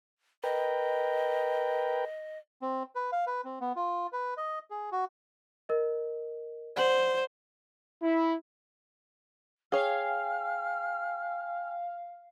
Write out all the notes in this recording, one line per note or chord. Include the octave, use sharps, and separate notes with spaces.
A#4 B4 D#5 G5
C4
B4
F5
B4
C4
B3
F4
B4
D#5
G#4
F#4
A#4 D#5
C5 D5 F#5 F#7
E4
G#4 C#5 F5 G5 G#5 F6